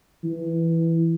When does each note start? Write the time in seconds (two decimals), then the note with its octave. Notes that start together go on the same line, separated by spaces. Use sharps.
0.24 E3